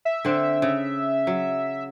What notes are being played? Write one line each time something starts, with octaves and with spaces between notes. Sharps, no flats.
E5
D3 C4
C#3
F#3